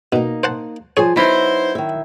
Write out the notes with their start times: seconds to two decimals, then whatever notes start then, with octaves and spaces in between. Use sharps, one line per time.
0.12 B2 A#3 D#4
0.43 C5 F#5 A5
0.97 F3 G#4 C5 C#5 G#5
1.16 F#3 B3 D#4 E4 C5
1.75 D#3 E5